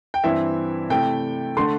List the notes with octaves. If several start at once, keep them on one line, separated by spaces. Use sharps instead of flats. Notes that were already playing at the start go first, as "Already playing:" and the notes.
G5
G2 E3 C4 E4 E5
C3 A3 E4 G5
D3 A3 C6